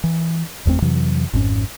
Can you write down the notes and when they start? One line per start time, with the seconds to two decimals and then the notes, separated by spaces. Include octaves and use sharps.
0.04 E3
0.65 F#1 E2 A3 C4
0.82 F2 C3 E3 F#3
1.33 G#1 F2 G#2 C#4